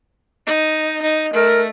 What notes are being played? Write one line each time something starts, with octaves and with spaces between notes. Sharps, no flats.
D#4
D#4
A3 A#4